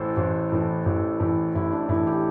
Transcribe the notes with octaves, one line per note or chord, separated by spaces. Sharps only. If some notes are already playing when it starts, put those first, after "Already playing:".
Already playing: A1 A2 E3 A4 C5
A1 C5
A2 E3
A1
A2 E3
A1 E4
D4
A2 E3 E4
G4